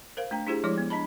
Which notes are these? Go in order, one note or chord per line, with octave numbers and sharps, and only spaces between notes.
A#4 C5 F5
A3 D4 G5 A#5
D4 E4 F4 G4 G#4 C5
F3 G#3 E4 C#5 D6
B3
D4 D#5 A5 B5